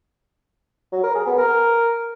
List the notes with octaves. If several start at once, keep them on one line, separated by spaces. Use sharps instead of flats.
F#3
A#4
G#4
B3
A#4